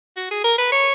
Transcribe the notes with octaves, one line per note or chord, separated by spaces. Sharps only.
F#4
G#4
A#4
B4
C#5